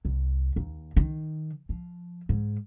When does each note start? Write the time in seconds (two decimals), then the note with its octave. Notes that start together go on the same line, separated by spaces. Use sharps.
0.05 C2
0.56 D#2
0.97 D#3
1.69 F3
2.29 G#2